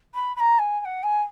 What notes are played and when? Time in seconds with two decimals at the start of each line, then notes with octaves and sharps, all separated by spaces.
0.14 B5
0.36 B5
0.40 A#5
0.59 G#5
0.81 G#5
0.85 F#5
1.03 G#5